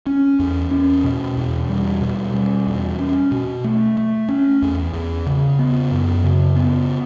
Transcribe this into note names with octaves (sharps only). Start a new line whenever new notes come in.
C#4
E2
C#4
B2
E2
G3
B2
G3
E2
C#4
B2
A3
A3
C#4
E2
E2
C#3
B3
F#2
C#3
B3